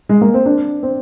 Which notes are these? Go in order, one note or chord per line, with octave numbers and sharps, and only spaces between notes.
G#3
A#3
C4
D4
C4